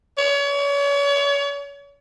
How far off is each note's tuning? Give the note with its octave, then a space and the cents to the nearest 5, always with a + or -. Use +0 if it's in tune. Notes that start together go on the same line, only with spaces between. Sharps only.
C#5 +35